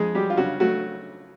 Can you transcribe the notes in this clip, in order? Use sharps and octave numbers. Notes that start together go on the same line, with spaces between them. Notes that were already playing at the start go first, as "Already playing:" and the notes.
Already playing: F2 G#3 G#4
F#3 G3 G4
F4
C#3 F#3 F#4
F#3 A3 F#4